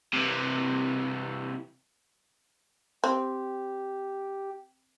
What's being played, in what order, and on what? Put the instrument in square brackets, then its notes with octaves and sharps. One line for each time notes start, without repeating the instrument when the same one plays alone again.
[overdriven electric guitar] C3 E3
[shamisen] C4 [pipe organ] G4